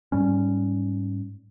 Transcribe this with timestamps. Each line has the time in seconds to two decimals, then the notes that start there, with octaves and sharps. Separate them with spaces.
0.12 G#2 G3 C#4